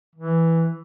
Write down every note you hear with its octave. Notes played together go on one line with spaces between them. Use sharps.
E3